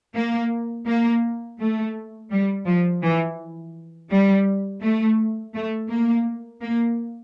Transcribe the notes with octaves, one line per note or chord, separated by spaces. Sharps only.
A#3
A#3
A3
G3
F3
E3
G3
A3
A3
A#3
A#3